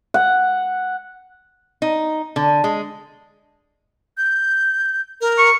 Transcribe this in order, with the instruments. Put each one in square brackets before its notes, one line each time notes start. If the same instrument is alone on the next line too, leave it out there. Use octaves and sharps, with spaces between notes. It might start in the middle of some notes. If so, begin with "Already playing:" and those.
[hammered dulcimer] F#5
[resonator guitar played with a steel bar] D#4
D3
G#3
[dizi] G6
A#4
[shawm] C#6